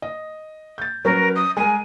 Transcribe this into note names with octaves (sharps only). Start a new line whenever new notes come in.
D#5
G6 A6
F#3 C#4 A#4 B4
D#6
G#3 A#4 G#5